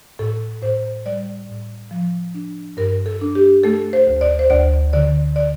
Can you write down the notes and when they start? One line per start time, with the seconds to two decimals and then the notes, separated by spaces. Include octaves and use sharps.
0.19 A2 A4
0.62 A2 C5
1.06 G3 D5
1.49 A2
1.91 F3
2.34 D4
2.77 G2 A#4
3.06 A4
3.21 D4
3.35 G4
3.63 A3 A4
3.93 C5
4.07 D2
4.21 D5
4.39 C5
4.50 D2 D5
4.93 D3 D5
5.36 D5